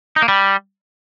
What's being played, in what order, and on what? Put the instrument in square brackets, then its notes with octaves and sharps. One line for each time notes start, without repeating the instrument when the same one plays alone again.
[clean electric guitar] D#4
A#3
G3